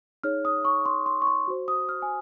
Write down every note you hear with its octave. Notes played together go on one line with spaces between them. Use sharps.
D#4 G#4 C#5 F6
D#6
C#6
C6
C6
C#6
C6
F#4 C5
D#6
F6
G#5